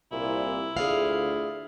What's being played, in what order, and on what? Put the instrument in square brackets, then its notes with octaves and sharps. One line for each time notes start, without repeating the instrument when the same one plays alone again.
[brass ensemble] C2 [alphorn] A#2 [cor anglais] E4
[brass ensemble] D2 [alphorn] F4 [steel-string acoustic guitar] G#4 D5 F5